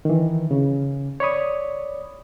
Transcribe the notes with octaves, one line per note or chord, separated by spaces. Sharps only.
D#3 E3
C#3
C#5 D5 B5 D#6